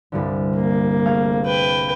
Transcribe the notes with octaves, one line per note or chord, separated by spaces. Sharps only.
C2 G2 D3
A#3
A3 G#4 F5
B4 G5